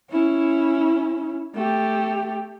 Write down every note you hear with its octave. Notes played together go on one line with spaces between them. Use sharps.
C#4 E4
A3 G4